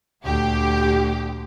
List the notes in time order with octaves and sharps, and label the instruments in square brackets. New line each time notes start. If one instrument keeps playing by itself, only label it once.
[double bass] D2 A#2 [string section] G4